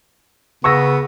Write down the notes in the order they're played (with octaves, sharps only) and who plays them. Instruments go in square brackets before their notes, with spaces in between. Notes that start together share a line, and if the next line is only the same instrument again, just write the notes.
[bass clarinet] C#3 [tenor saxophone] B3 [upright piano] C#6 E6 A#6